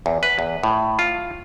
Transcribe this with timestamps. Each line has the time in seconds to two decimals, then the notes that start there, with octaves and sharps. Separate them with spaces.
0.06 E2
0.23 B4
0.39 E2
0.63 A2
0.99 F4